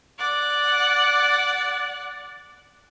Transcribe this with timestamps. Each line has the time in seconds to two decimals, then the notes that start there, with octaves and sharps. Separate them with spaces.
0.18 D5 F#5